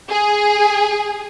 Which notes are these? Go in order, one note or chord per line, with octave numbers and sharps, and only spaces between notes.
G#4